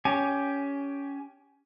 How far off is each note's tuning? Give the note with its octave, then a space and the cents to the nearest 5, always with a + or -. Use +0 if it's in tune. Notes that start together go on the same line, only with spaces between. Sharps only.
C#4 +15 G4 +0 G#5 +15